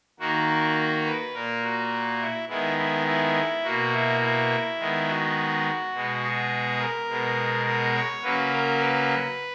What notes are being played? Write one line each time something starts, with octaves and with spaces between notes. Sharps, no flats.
D#3 A#3 F#4
B4
A#2 A#3 A#4
F#4
E4
D#3 G#3 B3 E4
E4
E4
B2 A#3 F#4
E4
E4
D#3 G#3 B3
F#4
B2 G#3 B3
G#4
A#4
B2 G#3 B3
A#4
C#5
C#3 F#3 A#3 B4
A#4
B4